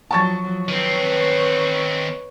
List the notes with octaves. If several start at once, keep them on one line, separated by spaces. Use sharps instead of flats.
F3 F#3 A5 C#6 A6
D#3 C4 B4 C#5